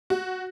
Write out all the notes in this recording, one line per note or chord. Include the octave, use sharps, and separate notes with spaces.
F#4